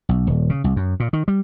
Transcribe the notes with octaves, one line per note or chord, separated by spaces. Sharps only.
B1
D#1
C#3
C2
F#2
A#2
D#3
G3